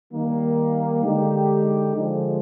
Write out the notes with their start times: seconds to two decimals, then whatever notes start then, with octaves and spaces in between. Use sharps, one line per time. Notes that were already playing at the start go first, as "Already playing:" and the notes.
0.12 D#3 G3 A#3
1.02 D3 G#3 D#4 G4
1.93 D3 F3 G#3